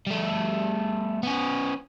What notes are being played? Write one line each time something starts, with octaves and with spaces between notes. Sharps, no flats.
G3 A3
B3 C#4